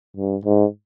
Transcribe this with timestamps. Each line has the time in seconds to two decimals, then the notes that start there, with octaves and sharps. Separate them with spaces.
0.17 G2
0.45 G#2